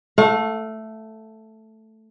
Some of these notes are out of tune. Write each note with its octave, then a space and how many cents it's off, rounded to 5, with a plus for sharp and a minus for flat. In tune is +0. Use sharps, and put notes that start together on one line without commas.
A3 +0 F5 +45